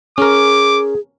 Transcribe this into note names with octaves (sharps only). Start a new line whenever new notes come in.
C#4 G#4 A#4 D6